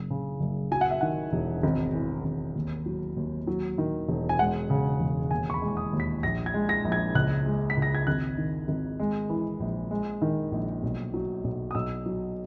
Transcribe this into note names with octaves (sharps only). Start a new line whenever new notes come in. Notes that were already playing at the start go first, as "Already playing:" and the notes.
Already playing: F#1
C#3
F#1
F#3 G#5
F#5
E5
D#3 F#5
E1
G#1
E3
G#1
D#2
F#3
D#2
F#3
D#3
E1
G#5
G#3 F#5
C#3
E1
D#2 G#5
C#6
B5
G#3
C#6
D#6
D#2
B6
A#1 A#6
G#6
G#3
A#6
A#1
G#6
C#2 F#6
G#3
B6
C#2
A#6
G#6
G#1 F#6
D#3
G#1
G#3
E3
A#1
G#3
D#3
A#1
B1
F#3
B1
D#6
B1 E6
F#3